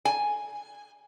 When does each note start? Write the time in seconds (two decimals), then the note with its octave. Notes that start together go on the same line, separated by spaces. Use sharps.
0.05 G#5